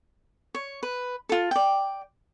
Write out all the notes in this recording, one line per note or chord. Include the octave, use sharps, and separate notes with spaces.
C#5
B4
F4 A4
D5 G5